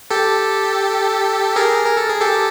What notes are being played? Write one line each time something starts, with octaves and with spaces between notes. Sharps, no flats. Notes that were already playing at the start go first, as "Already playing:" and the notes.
G4 A4
G#4 A#4
A#4
A4
G#4
G4 A4